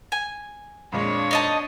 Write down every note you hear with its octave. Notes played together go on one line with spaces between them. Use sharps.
G#5
F2 A#2 G#3 D4 C#5
D#4 D#5 A5